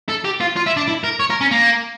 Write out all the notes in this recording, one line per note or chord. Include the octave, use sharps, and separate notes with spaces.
A4
G4
F4
F4
E4
D4
E4
A#4
C#5
A#4
C#4
A#3